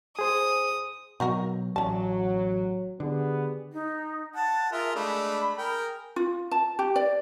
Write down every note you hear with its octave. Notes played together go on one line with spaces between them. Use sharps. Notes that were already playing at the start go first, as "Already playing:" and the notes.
G#4 C5 D#6
B2 D#3 F#3 F#4 A#4
A1 F#3 C#4 A5
D3 B3 G4 G#4
D#4
F#5 A5
F4 G#4 A#4 E5
G#3 A3 D4 B5
G#4 A#4 G5
F4
A5
G4
D5